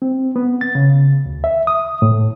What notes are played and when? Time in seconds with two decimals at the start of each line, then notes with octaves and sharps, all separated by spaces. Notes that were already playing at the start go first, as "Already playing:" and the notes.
0.02 C4
0.36 B3
0.61 A6
0.75 C#3
1.26 D2
1.44 E5
1.67 D#6
2.02 A2